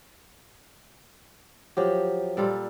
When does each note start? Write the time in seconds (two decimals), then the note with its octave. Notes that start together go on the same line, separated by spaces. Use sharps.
1.77 F3 F#3 G4
2.37 A#2 G3 F4 A4